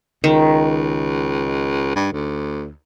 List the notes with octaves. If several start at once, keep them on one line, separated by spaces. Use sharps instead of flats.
C#2 D#3
G2
D2